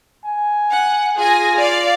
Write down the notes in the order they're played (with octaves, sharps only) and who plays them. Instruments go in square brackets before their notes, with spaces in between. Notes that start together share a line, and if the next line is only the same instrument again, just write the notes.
[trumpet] G#5
[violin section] F#5
[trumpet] F4 [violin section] G#4 G#5 A#6
[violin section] D5 F5